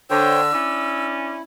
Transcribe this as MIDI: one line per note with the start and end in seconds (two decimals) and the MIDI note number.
0.10 0.52 50
0.10 0.41 72
0.10 0.41 73
0.10 0.41 79
0.10 1.07 88
0.53 1.40 61
0.53 1.40 62
0.53 1.42 64
0.53 1.40 74